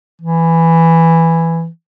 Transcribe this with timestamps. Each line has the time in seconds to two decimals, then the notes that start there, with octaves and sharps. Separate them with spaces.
0.22 E3